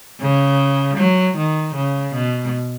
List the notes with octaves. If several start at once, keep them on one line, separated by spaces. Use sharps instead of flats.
C#3
F#3
D#3
C#3
B2